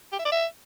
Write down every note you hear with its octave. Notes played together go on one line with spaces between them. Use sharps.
G4
E5
D5
E5